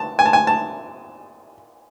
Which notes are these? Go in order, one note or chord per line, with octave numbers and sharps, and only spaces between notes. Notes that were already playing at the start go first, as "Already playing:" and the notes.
Already playing: A5
G#5
A5
G#5
A5